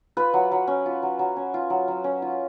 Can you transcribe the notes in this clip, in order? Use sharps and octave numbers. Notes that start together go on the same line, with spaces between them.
F4 B4
F#3
F#3
C#4
F4
F#3
F#3
C#4
F4
F#3
F#3
C#4
F4